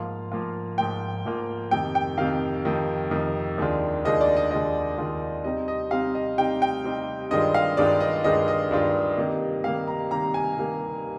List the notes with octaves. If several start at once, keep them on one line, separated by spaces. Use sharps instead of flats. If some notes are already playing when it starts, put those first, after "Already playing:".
Already playing: G#2 F3 A#3 F4 F5
G#2 F3 A#3 F4
G#2 F3 A#3 F4 G5
G#2 F3 A#3 F4
F2 C3 D#3 G5
G5
F2 C3 D#3 F5
F2 C3 D#3
F2 C3 D#3
D#2 D#3 G#3 D4 F4
D#2 D#3 G#3 D4 F4 D#5
D5
D#5
D#2 D#3 G#3 D4 F4 D#5
D#2 D#3 G#3 D4 F4
C3 G3 C4 D#4 D#5
D#5
C3 G3 C4 D#4 F5
D#5
C3 G3 C4 D#4 G5
G5
C3 G3 C4 D#4
G2 D#3 G#3 D4 F4 D#5
F5
G2 D#3 G#3 D4 F4 D5
D#5
G2 D#3 G#3 D4 F4 D#5
D#5
G2 D#3 G#3 D4 F4
C3 D#3 G3 A#3
C3 D#3 G3 A#3 F5
A#5
C3 D#3 G3 A#3 A#5
G#5
C3 D#3 G3 A#3